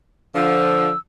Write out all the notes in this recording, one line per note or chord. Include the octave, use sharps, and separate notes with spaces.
D3 F3 E6